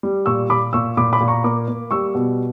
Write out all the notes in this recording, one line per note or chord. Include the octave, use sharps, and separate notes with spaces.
G3
A#2 C#6 E6
A#2 B5 D6
A#2 C#6 E6
A#2 B5 D6
B5 D6
A#2
A#5 C#6
A#3 B5 D6
A#3
G3 C#6 E6
B2